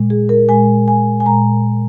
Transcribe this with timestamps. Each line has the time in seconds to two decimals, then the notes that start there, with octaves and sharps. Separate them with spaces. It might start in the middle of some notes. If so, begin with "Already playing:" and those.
Already playing: A#2 G#3
0.10 G#4
0.29 A#4
0.49 A#2 G#3 G#5
0.88 G#5
1.20 G#5
1.25 A#2 G#3 A#5